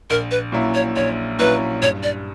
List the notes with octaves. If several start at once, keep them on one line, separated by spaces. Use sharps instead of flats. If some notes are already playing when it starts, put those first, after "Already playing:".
A#1 A#4
B4
A#2 F#3 C#4 E4
C#5
A#1 C#5
A#2 F#3 C#4 E4 B4
G2 C#5
D5